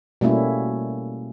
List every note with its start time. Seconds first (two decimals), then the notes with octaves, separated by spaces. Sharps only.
0.21 B2 G3 A3 A#3 C#4 E4